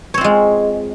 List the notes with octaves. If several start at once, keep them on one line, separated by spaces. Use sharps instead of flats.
G#3 C4 F4 C#5